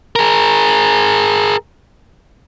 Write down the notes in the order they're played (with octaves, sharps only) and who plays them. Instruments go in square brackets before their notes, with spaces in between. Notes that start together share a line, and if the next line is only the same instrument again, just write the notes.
[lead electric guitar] G#4 A#4